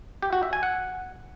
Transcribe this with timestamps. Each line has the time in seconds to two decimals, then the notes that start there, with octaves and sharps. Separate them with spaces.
0.22 G4
0.33 F#4
0.43 E5
0.53 G#5
0.63 F#5